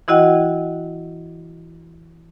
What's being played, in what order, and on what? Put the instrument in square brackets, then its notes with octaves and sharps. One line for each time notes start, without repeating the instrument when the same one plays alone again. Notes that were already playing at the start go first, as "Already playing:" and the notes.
[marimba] E3 E4 F#4 D#5 F#5 G5